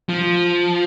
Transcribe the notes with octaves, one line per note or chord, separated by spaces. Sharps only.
F3